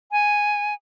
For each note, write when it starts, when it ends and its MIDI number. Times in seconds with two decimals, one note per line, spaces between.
0.12 0.74 80